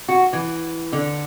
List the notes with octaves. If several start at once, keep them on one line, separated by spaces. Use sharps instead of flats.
F#4
E3
D3